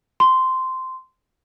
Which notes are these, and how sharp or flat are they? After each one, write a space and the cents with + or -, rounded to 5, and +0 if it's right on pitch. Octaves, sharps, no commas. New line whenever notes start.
C6 -10